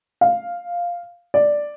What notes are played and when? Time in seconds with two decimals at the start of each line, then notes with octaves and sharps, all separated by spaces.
0.21 F5
1.34 D5